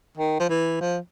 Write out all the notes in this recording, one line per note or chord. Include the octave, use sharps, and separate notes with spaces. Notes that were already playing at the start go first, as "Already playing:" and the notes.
D#3
F3
E3
F3